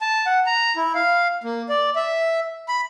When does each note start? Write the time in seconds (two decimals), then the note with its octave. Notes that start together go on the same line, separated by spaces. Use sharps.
0.01 A5
0.26 F#5
0.46 A#5
0.76 E4
0.95 F5
1.44 A#3
1.69 D5
1.96 E5
2.68 B5